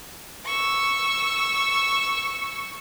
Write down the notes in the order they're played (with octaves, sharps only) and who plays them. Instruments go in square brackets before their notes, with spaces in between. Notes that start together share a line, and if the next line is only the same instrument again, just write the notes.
[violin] C#6 E6